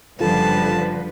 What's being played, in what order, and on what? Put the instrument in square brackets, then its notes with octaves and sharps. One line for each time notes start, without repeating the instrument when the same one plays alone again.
[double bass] F#1 G3 [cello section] D3 F3 B4 [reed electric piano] F4 A4 [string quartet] A5